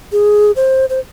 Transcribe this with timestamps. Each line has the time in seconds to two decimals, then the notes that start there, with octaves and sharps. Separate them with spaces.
0.12 G#4
0.56 C5
0.90 C5